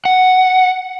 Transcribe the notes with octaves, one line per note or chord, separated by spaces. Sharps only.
F#5